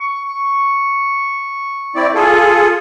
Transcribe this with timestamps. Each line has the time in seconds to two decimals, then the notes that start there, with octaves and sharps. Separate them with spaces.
0.01 C#6
1.95 C4 E4 D5
2.15 F4 G#4 A4